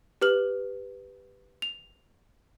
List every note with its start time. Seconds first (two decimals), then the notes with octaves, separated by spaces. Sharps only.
0.21 G4 B4 F6 F#7
1.62 F7